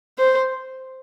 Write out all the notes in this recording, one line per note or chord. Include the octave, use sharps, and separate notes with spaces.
C5